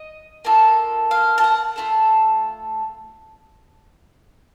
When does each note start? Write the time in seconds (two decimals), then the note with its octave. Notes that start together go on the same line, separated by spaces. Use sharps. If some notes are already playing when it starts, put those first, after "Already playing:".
Already playing: D#5
0.45 A#3 F4 A4
1.11 F5
1.38 A5
1.44 F#5
1.76 A3 C4 F4 A4